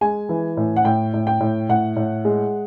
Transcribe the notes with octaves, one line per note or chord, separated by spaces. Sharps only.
G#3 G#5
E3
A2
F#5
A2 G5
A2
G5
A2
A2 F#5
A2
G#3